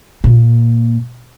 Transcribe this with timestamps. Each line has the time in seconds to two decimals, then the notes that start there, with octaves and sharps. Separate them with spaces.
0.24 A#2